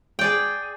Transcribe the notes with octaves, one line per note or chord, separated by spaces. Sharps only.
G#4 D5 G5